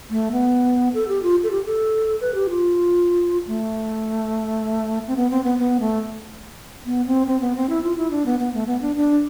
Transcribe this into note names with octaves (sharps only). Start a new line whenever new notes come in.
A3
B3
A4
G4
F4
A4
G4
A4
B4
G4
F4
A3
C4
B3
C4
B3
B3
A3
B3
C4
C4
B3
C4
E4
F4
E4
D4
B3
B3
A3
B3
D4
D4